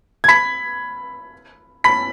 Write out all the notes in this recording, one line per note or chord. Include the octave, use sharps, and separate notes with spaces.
G#6
B5 B6
B5 B6